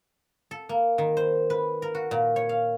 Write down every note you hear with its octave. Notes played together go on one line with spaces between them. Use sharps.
A4
A#3
D#3
C5
B4
A#4
F#4
A#2
C#5
F5